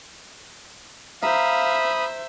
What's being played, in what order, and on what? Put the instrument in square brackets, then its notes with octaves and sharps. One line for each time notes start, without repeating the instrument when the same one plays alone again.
[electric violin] C5 E5 [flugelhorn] F5 [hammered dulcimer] A#5 [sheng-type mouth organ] B5 D#6